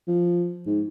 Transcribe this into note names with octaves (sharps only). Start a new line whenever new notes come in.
F3
G#2